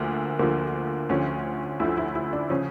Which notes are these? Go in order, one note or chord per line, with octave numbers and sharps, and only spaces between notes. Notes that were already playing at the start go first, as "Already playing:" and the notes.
Already playing: D2 D3 F3 A#3
D2 D3 F3 A#3
D2 D3 F3 C#4
D2 D3 F3 E4
E4
E4
D4
C#3 F3 C#4